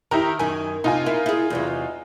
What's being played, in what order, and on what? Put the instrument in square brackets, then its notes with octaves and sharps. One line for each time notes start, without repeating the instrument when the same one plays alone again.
[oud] D#3 [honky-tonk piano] E4 G4 A#4
[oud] F#2 D#3 [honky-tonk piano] G#5
[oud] C3 [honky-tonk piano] D#4 F4 G#5
[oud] E4 A#4
E4 G#4
E2 C3 F#3